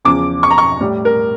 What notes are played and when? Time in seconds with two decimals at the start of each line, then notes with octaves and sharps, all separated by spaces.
0.05 E2 C#3 F3 D6
0.43 C#6
0.50 A#5
0.58 C#6
0.81 A2 G3
1.05 A#4